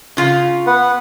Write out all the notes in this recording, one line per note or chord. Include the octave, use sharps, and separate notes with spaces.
C#3 F4 F5
B3 B4 F#5